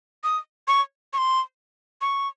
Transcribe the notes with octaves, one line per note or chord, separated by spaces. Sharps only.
D#6
C#6
C#6
C6
C#6